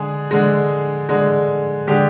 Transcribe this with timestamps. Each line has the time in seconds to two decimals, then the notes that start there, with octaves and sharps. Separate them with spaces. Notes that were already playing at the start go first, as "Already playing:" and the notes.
Already playing: D3 G#3 G#4
0.31 D3 G#3
1.09 D3 G#3
1.87 D3 G#3 G4